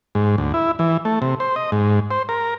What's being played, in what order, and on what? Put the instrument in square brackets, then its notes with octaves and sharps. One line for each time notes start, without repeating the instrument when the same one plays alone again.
[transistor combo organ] G#2
D2
E4
E3
A3
C3
C5
D#5
G#2
C5
A#4